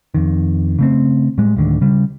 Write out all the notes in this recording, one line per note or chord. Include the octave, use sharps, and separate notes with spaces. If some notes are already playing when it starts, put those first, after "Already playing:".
F2 D#3
C#3 A3 C4
A2 G3 G#3
D1 D2 D3 D#3
C#3 G3